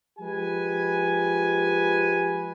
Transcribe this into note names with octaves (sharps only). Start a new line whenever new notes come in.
F3 G#3 G4 B4 G#5